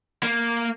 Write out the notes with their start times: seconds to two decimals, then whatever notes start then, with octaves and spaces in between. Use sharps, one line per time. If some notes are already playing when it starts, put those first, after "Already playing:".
0.23 A#3